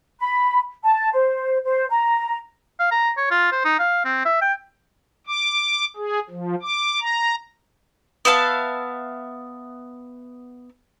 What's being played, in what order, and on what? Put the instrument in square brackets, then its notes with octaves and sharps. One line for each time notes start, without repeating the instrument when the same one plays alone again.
[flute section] B5
A5
C5
C5
A#5
[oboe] F5
A#5
C#5
F4
C5
D#4
F5
C4
E5
G5
[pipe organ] D6
G#4
F3
D6
A#5
[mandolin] B3 E5 F5 A5